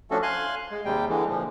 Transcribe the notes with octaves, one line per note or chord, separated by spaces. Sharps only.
F3 A3 C#4 D4 F#4 A4
F5 G#5 C6 F#6
G#3
D#2 C3 G3 G#3 G5
D3 E3 G#3
A#2 F3